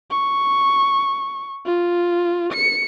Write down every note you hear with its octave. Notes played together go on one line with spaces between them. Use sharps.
C#6
F4
C#7